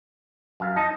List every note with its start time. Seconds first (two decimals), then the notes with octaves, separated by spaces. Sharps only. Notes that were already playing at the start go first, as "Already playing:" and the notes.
0.60 F#2 F5
0.76 D#4 A5 D#6